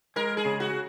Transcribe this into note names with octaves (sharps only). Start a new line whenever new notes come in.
G#3 A#4
G#4
C#3
F#4